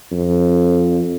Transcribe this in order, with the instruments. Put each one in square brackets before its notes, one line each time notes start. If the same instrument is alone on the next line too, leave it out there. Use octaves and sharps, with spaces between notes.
[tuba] F2